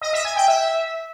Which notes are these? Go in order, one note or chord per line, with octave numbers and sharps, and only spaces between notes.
D#5
E5
G#5
G5
E5